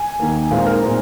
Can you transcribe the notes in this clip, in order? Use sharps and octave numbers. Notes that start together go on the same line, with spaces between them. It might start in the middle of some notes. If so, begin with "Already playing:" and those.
Already playing: G#5
D#2 D#3 A#3
A#2 G#3 C4 D#4 F5
A#4
A#2 G#3 C4 D#4